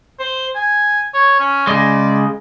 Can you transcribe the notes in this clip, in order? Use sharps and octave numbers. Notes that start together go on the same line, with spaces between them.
C5
G#5
C#5
C#4
C#3 G#3 D5